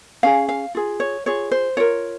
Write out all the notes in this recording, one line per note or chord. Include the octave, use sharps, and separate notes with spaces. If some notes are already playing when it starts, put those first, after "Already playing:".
C#4 G#4 F5
F5
F4 G#4
C#5
F4 G#4 C#5
C5
F4 A#4 C#5